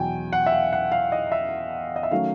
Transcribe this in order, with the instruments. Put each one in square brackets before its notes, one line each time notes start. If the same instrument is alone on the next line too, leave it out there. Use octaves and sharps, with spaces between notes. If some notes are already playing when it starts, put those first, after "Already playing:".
Already playing: [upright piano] E2 B2 F#3 G5 G#5
F#5
E5
F5
F#5
F5
D#5
E5
D#5
E5
D#3 F#3 A3 C#4 F5